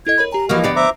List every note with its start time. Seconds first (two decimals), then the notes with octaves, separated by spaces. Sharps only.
0.07 E4 A4 D#5 G#6
0.18 A#4 C#5 B5
0.32 G4 G#5 A#5
0.49 E3 F3 A#3 F#4 D#5 F6
0.64 D2 B3 G4 D5 A#6 C7 D7
0.76 C5 E5 A#5 D6